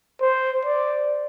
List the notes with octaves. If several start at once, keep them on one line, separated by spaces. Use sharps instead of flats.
C5
D5